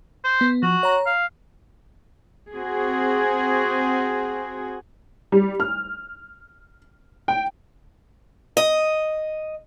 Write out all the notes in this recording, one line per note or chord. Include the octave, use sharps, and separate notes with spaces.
C5
B3
F3 F#4
C#5 A#5
F5
C4 F#4 G#4
G3
F6
G5
D#5